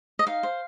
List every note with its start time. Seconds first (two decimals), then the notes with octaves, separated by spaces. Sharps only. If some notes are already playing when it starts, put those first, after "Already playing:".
0.19 D#5
0.27 D#4 F5
0.43 C5